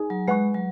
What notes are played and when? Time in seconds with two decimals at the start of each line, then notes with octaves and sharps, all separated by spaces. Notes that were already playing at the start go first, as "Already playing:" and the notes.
Already playing: D#4 G#4
0.10 F#3
0.28 G#3 B4 F#5 C#6
0.54 F#3